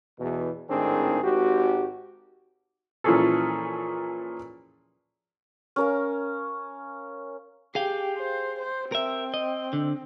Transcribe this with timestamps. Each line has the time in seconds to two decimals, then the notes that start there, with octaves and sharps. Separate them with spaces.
0.19 E2 B2
0.69 G#1 A2 D#3 C4 D4 G#4
1.23 G#1 F#4 G4
3.04 A#2 E3 F3 C#4 G#4 A4
5.76 C#4 A#4 F5
7.75 G4 G#4 F5 G5
8.17 C5
8.59 C5
8.92 C4 A#4 E5
9.34 D#5
9.73 D3